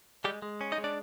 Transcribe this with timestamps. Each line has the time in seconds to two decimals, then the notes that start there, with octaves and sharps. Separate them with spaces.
0.24 G3 G#3 G4
0.42 G#3
0.61 C#4
0.72 D#4 D#5
0.78 G#3
0.84 D4 D5